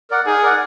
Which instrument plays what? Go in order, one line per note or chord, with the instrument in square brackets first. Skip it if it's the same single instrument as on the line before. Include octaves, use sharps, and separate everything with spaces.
[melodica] A#4 D5 F#5
[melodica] D#4 [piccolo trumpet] G#4
[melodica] A#4 D5 F#5